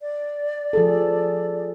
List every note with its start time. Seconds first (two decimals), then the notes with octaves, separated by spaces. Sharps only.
0.01 D5
0.73 F3 G#4 A4